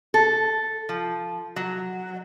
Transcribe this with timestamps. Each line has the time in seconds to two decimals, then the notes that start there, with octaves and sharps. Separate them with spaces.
0.14 A4
0.89 F3
1.56 F#3